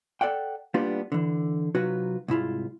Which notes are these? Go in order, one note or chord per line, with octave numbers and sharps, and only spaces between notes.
A4 D5 F#5 G5
G3 A#3 B3 D4 F4 G4
D3 E3
C3 F#3 D#4 F4 F#4 B4
C2 G#2 E4 F4